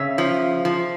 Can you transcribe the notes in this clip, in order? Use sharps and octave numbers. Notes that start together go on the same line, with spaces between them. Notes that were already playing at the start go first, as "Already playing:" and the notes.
Already playing: C#3 C#5 E5
F3
F3